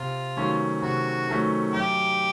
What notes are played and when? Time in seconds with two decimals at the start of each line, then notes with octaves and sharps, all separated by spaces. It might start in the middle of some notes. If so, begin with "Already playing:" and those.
Already playing: C3 F4
0.37 D#3 F#3 A3 C#4
0.82 C3 F#4
1.28 D#3 F#3 A3 C#4
1.73 F#2 G4